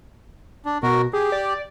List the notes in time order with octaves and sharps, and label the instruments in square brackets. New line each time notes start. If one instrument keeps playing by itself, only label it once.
[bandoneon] D4
[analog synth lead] B2 [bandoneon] F#4 A#4
[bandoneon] G4 [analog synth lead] G#4
[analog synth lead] D5